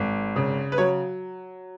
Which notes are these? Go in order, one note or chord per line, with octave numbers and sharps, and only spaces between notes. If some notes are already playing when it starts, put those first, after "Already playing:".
Already playing: G#1
C#3
B4
F#3 C#5